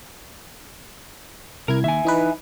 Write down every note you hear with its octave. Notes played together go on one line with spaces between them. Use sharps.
C2 E4 A#4 G#6
D#2 E5 G#5
E3 D#4 B4